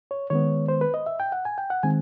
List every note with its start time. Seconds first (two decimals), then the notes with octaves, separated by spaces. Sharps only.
0.11 C#5
0.30 D#3 G#3 B3 C#5
0.68 C5
0.81 B4
0.94 D#5
1.06 E5
1.20 G5
1.32 F#5
1.45 G#5
1.58 G5
1.70 F#5
1.83 D#3 G#3 C4 G#5